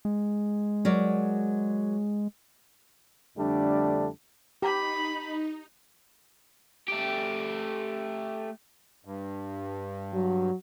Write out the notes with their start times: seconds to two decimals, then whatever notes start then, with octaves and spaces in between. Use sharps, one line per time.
0.05 G#3
0.85 F#3 A#4 D5
3.38 F2 D3 G3 A3 D4
4.62 D#4 G4 B5
6.88 A3 G4
9.05 G2
10.13 F#3